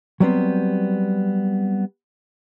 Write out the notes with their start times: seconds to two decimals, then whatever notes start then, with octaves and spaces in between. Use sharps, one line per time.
0.20 F#3 G3 B3 C4